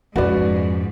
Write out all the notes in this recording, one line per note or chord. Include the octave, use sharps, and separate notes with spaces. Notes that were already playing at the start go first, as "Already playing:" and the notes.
F2 G#2 C#4 F#4 B4 D5